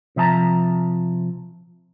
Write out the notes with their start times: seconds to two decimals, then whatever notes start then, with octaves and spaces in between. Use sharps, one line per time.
0.16 C3 F3 E5 A5 A#5